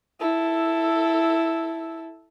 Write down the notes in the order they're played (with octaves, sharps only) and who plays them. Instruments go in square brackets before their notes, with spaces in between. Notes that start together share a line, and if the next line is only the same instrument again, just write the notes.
[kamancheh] E4 A4